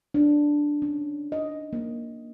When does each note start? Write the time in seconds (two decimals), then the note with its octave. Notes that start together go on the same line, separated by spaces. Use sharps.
0.14 D4
0.82 C#4
1.32 D#5
1.73 A#3